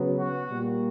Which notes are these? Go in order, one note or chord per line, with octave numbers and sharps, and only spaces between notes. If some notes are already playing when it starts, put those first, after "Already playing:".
Already playing: C#3 F#3 B3
F#4
A#2 G3 A#3